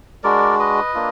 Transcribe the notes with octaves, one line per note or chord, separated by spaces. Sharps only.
G#3 D4 F#4 A#4 D5
B4 D#5
A#3 D4 F4